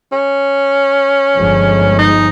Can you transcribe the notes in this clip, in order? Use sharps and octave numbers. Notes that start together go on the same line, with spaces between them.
C#4
G1 F3 G#3
D#4